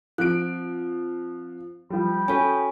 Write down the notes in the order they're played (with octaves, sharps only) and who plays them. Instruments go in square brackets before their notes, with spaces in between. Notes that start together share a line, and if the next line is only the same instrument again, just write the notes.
[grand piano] F3 D7 [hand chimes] C4 F#6
[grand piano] F3 G3 [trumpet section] G5 B5
[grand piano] C#4 [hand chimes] F#4 A4 G#5